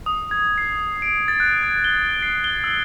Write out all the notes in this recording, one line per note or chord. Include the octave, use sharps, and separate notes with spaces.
D#6
G#6
C7
D7
A6
F#6
G#6
G7
C7
G7
E6